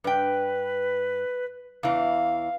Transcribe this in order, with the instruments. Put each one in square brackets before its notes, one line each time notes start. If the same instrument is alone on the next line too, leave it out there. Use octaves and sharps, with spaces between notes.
[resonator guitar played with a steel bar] G2 G5 [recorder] B4
[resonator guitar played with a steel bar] E2 E3 [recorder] F5